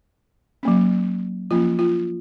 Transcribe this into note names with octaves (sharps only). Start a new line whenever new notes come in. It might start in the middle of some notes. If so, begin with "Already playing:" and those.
F#3 A#3 C#4
F3 A#3 C#4 F4
F4